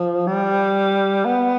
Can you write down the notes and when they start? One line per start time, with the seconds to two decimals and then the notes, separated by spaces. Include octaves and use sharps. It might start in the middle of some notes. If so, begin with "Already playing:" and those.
Already playing: F3
0.27 G3
1.25 B3